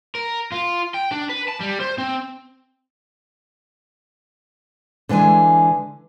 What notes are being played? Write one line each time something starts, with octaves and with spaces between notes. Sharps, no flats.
A#4
F4
G5
D4
B4
A5
G3
C5
C4
D3 E3 G#3 G#5